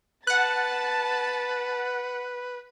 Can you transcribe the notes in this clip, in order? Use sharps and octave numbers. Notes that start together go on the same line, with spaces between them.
B4 F#5 A5 F#6 A6